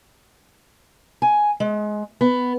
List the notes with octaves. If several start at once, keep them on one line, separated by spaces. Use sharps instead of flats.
G#5
G#3
B3